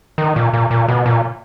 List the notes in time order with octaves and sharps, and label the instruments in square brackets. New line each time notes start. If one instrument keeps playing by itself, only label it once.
[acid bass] D#3
A#2
A#2
A#2
B2
A#2